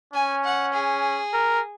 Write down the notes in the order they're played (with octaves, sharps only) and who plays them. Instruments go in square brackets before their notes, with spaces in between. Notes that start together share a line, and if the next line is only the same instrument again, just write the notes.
[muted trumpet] C#4 [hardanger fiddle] G#5
[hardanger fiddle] F#5
G#4
[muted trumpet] A#4